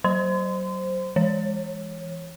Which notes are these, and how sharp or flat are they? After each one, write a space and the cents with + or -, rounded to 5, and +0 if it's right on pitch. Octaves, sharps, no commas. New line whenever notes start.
F#3 +25 C5 +0 C6 -30
E3 +20 C#5 -15